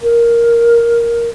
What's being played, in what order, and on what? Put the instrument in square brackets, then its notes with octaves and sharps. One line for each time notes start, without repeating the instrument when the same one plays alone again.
[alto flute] A#4